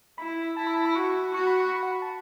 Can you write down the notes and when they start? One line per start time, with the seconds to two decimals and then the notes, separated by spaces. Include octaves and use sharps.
0.18 E4 B5
0.57 E4 A5
0.67 B5
0.76 A5
0.85 B5
0.95 F#4 C#6
1.34 F#4 C#6
1.47 B5
1.60 C#6
1.72 B5
1.83 F#5
1.92 B5
2.02 A5